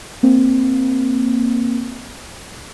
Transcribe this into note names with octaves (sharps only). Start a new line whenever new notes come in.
A#3 C4